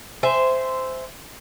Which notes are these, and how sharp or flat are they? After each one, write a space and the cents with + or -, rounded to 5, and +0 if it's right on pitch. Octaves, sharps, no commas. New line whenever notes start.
C5 -15 E5 +0 G#5 +0